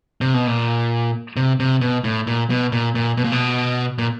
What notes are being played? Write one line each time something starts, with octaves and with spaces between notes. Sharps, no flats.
C3
B2
A#2
C3
C3
B2
A2
A#2
B2
A#2
A#2
B2
A#2
B2
A#2